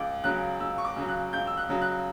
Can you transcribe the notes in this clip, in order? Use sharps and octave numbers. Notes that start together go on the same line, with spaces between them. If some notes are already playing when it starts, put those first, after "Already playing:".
Already playing: C#2 D6
C#3 F#3 F#6
C#2 E6
C#6
D6
C#3 F#3
F#6
C#2 G6
E6
F#6
C#3 F#3
F#6